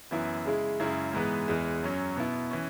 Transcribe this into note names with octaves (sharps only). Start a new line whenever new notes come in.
F#2 E3 B3 E4
C#3 G#3 E4
F#2 C#3 G#3 E4
G#2 E3 G#3 B3
E2 E3 G#3
F#2 F#3 C#4
B2 B3 E4
E3 C#4